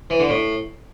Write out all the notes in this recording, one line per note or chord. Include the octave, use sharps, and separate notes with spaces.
E3
D3
A2